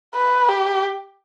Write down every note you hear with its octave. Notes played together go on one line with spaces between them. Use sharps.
B4
G4